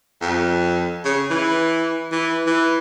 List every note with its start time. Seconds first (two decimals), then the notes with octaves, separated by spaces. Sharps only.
0.21 F2
1.05 C#3
1.31 E3
2.12 E3
2.46 E3